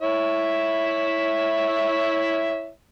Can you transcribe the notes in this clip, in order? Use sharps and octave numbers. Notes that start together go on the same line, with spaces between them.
E4 C#5 E5